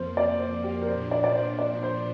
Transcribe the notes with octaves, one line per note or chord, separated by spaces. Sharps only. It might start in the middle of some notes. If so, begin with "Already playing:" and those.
Already playing: F2 F3 A#3 C5
D5
C5
G4
A#4
A#2 F3 D4 C5
D5
D5
C5
D5
C5